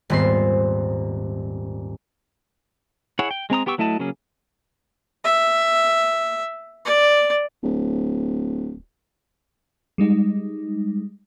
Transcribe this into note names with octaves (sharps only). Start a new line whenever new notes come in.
D#1 G#2 B3 C4 C6 C7
E4 G#4 C#5 F#5
G5
G#3 C4 A#5 D#6
B3 G4 G5 C#6 E6
F#3 A3 E4 D#5 A5
C#3 F#3 A#3 C#4 G#4
E5
D5
D1
G3 G#3 D#4